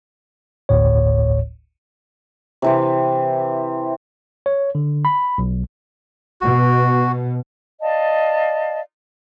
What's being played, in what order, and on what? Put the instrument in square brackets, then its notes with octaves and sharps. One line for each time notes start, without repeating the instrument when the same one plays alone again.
[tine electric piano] G1 D2 A2 C#5
[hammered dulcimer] C3 E3 C4
[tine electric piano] C#5
D3
B5
B1
[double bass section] B2 [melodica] F#4
[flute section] D5 D#5 F5 A5